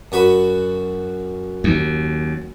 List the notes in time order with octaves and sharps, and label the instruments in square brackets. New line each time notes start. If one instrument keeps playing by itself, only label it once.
[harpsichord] F#2 F#4 B5
[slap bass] D#2